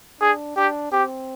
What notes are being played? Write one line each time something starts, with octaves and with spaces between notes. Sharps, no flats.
D4 G#4
D4 G4
C4 G4